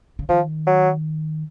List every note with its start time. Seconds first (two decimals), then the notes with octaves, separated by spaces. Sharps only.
0.19 C#3
0.29 D#3 F3
0.67 F#3